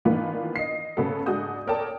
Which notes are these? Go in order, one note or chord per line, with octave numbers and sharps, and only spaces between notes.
D#3 E3 A#3 B3 D4 F4
D#5 C7
C#3 A3 B3 F#4 A4
G#2 D4 F#4 G#4 D#6 G6
A4 A#4 C#5 D5 G5 A5